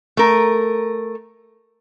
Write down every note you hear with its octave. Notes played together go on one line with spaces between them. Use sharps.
A3 A#4